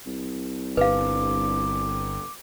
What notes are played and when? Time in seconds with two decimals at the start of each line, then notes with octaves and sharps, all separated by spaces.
0.06 C2
0.77 G1 B4 F5 D6